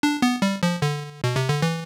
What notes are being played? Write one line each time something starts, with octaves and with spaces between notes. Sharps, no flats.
D4
B3
G3
F3
D3
B2
C3
D3
E3